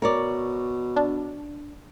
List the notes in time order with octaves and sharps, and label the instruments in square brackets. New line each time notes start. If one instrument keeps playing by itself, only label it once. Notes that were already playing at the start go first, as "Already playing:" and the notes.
[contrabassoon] B2 [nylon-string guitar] A#4 C#5 D5
[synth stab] D4